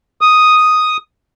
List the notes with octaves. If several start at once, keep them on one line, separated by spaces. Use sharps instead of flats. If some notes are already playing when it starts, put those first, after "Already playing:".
D#6